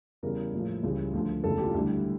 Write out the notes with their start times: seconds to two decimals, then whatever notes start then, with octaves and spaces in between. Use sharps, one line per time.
0.23 E2 C#3 E3 G3 A#4
0.53 A#1 A2 F3
0.83 C#2 C#3 E3 G3
1.13 D2 D3 F3
1.44 E1 D2 C#3 E3 A4
1.58 G4
1.64 F4
1.74 D2 D3 G3 E4